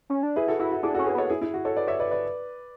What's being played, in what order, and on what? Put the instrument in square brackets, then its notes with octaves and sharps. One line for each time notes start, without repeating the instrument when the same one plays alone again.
[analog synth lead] C#4
D4
[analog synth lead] E4 [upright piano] G#4 B4
[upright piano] F#4 A4
[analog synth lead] E4 [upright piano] F#4
[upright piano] F#4
[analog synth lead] D4 [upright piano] E4 G#4
[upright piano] F#4 A4
[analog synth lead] C#4
[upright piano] G#4 B4
[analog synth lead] B3 [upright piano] A4 C#5
[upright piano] E4 G#4
E4
F#4
A4 C#5
B4 D5
C#5 E5
B4 D5
B4 D5